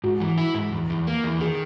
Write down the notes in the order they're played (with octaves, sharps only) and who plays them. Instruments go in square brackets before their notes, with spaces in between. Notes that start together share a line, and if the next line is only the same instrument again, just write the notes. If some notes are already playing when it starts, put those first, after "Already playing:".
[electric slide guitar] G#2 [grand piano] F#4
[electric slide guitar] E3
E4
G#2
E2
E2
A#3
E2
[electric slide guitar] D#3 [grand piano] G#4